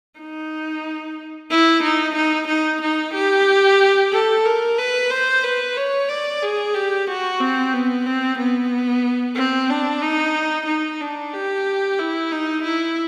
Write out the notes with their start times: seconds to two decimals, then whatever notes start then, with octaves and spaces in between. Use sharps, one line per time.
0.20 D#4
1.50 E4
1.83 D#4
2.16 D#4
2.49 D#4
2.82 D#4
3.14 G4
4.12 A4
4.46 A#4
4.78 B4
5.10 C5
5.44 B4
5.77 C#5
6.09 D5
6.42 G#4
6.74 G4
7.07 F#4
7.40 C4
7.73 B3
8.06 C4
8.39 B3
9.36 C4
9.70 D4
10.02 D#4
10.67 D#4
11.01 D4
11.33 G4
11.99 E4
12.32 D#4
12.64 E4